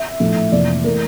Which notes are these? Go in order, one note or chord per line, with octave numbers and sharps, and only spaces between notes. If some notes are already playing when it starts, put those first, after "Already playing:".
Already playing: E5
A#1 A2 F3 A3
F1 F2 E3 A#3 D5
E3 A3 A#4